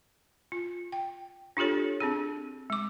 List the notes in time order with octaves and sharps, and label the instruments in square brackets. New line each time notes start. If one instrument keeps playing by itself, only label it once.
[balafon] F4
G5
D4 F4 G4 A4 C#5
C4 D4 G#4
G#3 D6